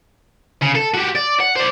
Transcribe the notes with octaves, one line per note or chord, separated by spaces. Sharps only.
C#3
A4
F#4 G4
D5
F#5
C5 D5